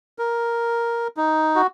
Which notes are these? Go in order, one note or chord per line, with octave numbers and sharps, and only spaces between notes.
A#4
D#4
F#4